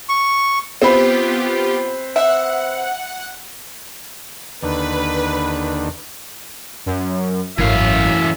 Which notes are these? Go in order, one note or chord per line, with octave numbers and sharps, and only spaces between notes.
C#6
B3 C4 F4 G4 B4
E5 F#5
D#2 D3 B4
F#2
G#1 F#2 A2 E3 E5 F5